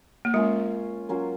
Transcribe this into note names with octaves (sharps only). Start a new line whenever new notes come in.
A#3
G#3 C#4 F4 A#4
F#3 C#4 F4 A#4